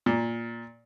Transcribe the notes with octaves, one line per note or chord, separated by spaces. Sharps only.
A#2